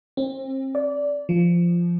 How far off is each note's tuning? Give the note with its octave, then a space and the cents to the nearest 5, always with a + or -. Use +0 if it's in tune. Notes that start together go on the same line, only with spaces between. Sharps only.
C4 +35
D5 -20
F3 -10